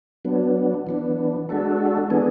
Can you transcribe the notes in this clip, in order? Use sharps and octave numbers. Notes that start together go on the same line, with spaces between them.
F#3 B3 D4
E3 B3 D4
G#3 D4 F#4 A4
E3 B3 D4 G#4